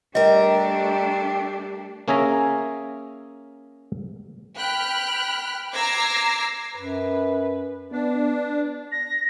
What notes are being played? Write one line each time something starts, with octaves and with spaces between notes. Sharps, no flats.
G3 A3 D4 G4 A#4 D#5
A#3 C#4 G#4 E5 A#5
G5 B5 F6 F#6
A#5 D6 E6 G#6 A#6 C7
F#2 B4
B3 D4
A#6